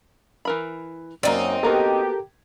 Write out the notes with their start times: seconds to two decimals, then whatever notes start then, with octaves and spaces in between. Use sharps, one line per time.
0.45 E3 A#4 B5
1.23 F#2 A#3 C4 D#4 D5
1.63 A#3 B3 F#4 G4 A4 A#4 A#5